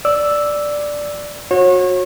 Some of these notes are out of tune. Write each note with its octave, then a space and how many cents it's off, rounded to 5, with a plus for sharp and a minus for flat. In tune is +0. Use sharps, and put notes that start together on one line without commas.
D5 +0 E6 +0
F#4 -25 C#5 -35